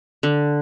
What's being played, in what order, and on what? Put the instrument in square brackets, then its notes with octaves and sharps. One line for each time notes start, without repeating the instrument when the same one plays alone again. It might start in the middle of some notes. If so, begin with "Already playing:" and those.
[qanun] D3